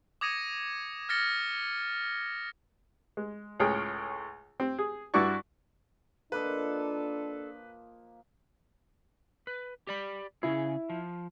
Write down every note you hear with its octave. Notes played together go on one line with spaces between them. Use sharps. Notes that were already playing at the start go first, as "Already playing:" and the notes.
D6 D#6 G#6 A#6 C#7 D#7
F6 A6 A#6 C#7 G7
G#3
C#2 A2 G#4 C#5 G5 F6
C4
G#4
G2 D4 E4 F#4 D5 C#6
F3 A#3 D4 A4 B4 D#5
B4
G4 D5 B5
C#3 E4 G#4
F3